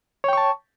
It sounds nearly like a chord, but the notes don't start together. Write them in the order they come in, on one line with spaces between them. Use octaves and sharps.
C#5 G5 C#6 A5